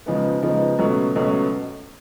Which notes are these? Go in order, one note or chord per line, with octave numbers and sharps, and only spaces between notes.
C#3 F3 G#3 B3 D#4
C#3 F3 G#3 B3 D#4
C#2 B2 F#3 A3 C#4
C#2 B2 F#3 A3 C#4